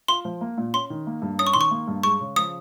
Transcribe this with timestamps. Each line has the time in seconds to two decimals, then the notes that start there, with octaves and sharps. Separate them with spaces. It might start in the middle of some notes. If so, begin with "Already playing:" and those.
0.08 F4 C6
0.25 F3
0.41 A#3
0.58 A#2
0.73 C#4 C6
0.90 D#3
1.07 A#3
1.22 G2
1.39 C#4 D#6
1.47 C#6
1.54 D#3 C6
1.61 C#6
1.71 A#3
1.88 G2
2.03 G#3 C#6
2.20 C#3
2.36 F3 D#6